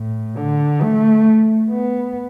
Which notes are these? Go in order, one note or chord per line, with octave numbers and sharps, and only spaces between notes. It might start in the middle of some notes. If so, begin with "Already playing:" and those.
Already playing: A2
D3
A3
B3